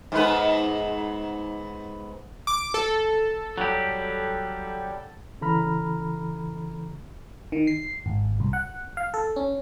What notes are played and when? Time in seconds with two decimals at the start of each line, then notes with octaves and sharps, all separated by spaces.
0.12 G#2 B3 B4
2.47 D6
2.74 A4
3.58 F#3 G3 G4
5.41 C#3 E3 A4 A#5 B5 F6
7.52 D#3
7.67 C7
8.06 G#1
8.40 C2
8.53 F#5
8.97 F5
9.14 A4
9.36 C#4